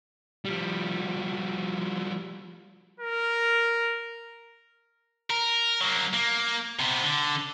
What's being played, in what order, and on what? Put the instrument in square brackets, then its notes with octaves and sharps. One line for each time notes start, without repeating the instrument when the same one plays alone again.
[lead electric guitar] F3 G3
[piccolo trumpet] A#4
[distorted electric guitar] A#4
F#3 A#3
A#3
C3 B3
D3